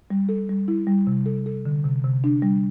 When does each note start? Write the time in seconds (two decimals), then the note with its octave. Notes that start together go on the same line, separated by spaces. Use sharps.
0.10 G3
0.29 A4
0.49 G3
0.68 E4
0.87 G3
1.07 C3
1.26 A4
1.46 A4
1.66 D3
1.85 C3
2.04 C3
2.24 D4
2.42 G3